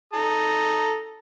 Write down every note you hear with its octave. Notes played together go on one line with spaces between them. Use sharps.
A4 A#5 D#6